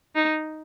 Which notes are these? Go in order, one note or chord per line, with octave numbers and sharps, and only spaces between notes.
D#4